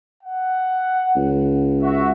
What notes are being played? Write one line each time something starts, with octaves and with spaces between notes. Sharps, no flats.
F#5
C#2
F#4 E5